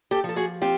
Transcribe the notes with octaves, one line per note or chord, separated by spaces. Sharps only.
G4 A4
F3
A4
F#4 G#4
C4 F4 G4